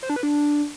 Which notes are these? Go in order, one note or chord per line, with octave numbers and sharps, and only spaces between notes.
C5
D4
B4
D4